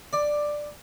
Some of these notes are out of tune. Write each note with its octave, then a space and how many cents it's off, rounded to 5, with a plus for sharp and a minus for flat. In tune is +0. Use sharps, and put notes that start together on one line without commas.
D5 +10